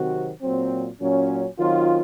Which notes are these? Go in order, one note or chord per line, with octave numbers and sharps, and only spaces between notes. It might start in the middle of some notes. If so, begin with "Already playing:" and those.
Already playing: C3 D#3 F#3 C4 F#4
A#2 F#3 C4
A#2 F#3 C#4
D#3 F#3 C4 F4